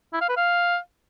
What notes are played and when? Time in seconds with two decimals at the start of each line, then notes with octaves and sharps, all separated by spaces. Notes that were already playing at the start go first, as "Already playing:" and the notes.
0.13 E4
0.21 F5
0.29 B4
0.37 F5